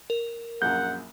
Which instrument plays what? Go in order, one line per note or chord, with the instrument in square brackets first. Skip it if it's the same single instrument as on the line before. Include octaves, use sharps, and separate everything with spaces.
[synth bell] A#4
[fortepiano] A#1 F#2 [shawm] F#5 [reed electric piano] G6